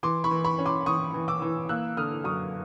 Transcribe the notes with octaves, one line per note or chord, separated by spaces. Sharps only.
E3 C6 D6
B5 C#6
E3
B5 C#6
C#4
C6 D6
E3 C#6 D#6
E3
D6 E6
E3
A#3 E6 F#6
D3 D#6 F6
F#2 C#6 D#6